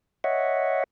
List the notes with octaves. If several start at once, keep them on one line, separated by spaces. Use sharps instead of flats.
C#5 D#5 E5 F#5